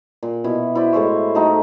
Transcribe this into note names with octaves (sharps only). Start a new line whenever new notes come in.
A#2
B2 E4
E4 B4 C5 D5
A2 G#3 C5 C#6
A3 D#4 F#4 A5